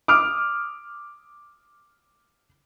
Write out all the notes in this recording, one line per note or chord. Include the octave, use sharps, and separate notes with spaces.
D6 D#6 F6 D7